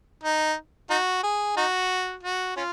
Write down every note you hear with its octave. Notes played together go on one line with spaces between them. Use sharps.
D#4
D#4 F#4
G#4
D#4 F#4
F#4
C#4 F4